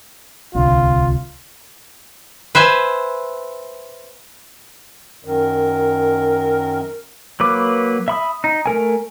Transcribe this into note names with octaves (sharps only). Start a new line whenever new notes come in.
D1 C2 D3 F4
B4 C5 E5 G#5
F#2 D#3 A#4
F#3 A#3 B4 D6
E5 B5 D#6
D#4
A3 A#4 G#5